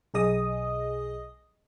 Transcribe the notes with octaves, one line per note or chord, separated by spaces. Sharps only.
B1 G#4 D#5 D#6